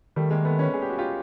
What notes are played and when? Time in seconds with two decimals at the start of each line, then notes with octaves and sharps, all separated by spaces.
0.16 D#3 G3 A3
0.31 G#3 A#3
0.45 A3 B3
0.59 B3 C#4
0.74 G#4
0.82 G4
0.90 F#4
0.99 F4 G4